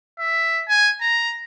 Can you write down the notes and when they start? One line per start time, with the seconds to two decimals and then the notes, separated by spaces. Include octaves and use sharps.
0.20 E5
0.69 G#5
1.01 A#5